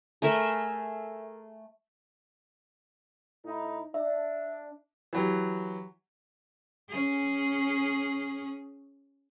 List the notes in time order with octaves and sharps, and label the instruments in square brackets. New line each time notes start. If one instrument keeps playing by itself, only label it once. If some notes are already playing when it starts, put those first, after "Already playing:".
[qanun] A3 G#4 A#4 E5
[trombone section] A2 D#4 E4
[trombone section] D4 [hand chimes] E5
[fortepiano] E3 F#3 G4
[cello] C#4 G#4